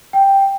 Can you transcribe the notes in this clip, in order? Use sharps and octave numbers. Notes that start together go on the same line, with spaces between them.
G5